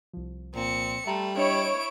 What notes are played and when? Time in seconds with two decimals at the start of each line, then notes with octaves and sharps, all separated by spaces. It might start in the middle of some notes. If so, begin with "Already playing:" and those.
0.13 C2 F3
0.55 A#2 C4 C#7
1.07 G3 A3 E5 A#5 C6
1.37 D4 E4 C#5 D#5 D7